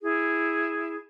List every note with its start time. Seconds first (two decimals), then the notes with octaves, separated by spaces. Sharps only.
0.02 E4 G#4